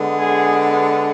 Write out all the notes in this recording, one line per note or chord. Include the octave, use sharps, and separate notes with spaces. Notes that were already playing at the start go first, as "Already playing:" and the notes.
Already playing: D3 G#3 B3
G#4